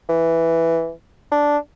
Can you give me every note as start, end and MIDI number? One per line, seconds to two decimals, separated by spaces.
0.09 0.90 52
1.32 1.58 62